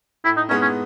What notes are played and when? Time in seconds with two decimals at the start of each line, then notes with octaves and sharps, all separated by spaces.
0.24 A2 E4
0.37 D#4
0.49 G#3 B3 C#4 D#4
0.62 C#4